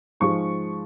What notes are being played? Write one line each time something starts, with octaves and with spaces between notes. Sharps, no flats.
G#2 F3 G#3 C#6